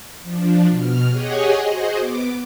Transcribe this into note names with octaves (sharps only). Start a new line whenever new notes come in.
F3 D4
B2 F6
G4 G#4 C#5 D#5 F#5 G#5
F#4 G#4 C5 D#5
B3 D6